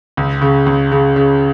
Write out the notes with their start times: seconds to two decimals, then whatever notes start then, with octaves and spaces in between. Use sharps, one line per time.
0.17 C#2
0.42 C#3
0.66 C#2
0.92 C#3
1.16 C#3